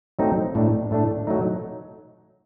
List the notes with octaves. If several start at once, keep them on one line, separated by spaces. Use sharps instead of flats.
F#3 A3 C4 D#4
A2 A3 D4
A2 A3 D4
F#3 A3 D#4